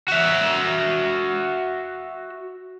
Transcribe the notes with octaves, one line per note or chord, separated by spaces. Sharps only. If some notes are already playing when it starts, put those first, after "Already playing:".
F#4 E5